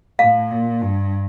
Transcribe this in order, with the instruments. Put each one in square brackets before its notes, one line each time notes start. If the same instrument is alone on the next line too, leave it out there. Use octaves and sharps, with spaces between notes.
[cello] A2 [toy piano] F5
[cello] A#2
G2